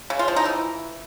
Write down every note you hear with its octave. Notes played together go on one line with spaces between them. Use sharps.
C#3
F4
F3
D#4
E3